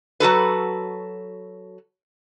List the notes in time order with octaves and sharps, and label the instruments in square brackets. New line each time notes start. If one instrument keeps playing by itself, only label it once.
[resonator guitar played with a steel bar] F#3 F#4 A4 B4